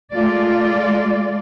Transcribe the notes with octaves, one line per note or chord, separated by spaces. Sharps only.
G#3 A3 F4 D5